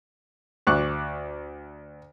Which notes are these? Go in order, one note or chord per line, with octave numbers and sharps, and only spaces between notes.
D2 C#6 D6 F#6